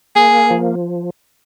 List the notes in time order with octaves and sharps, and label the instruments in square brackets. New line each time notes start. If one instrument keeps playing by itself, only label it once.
[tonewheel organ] A#3 [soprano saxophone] G#4
[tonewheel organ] F3